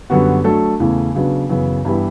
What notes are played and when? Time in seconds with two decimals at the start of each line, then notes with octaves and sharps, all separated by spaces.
0.10 F#2 D3 G3 B3 F#4
0.44 F#3 A3 D4 A4
0.80 E2 C#3 E3 A3
1.15 C#3 F#3 B3 D4
1.49 F#2 C#3 E3 B3
1.85 G2 E3 B3 E4 G4